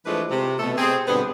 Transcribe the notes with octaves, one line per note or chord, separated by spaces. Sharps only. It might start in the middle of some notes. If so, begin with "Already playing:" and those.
E3 F3 G#3 A3 D4 B4
C3
B2 A3 A4
C4 G#4
G2 B2 D3 B3